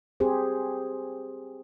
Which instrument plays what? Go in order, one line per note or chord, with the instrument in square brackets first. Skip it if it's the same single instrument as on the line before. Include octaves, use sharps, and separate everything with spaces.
[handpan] C4 G4 G#4 C5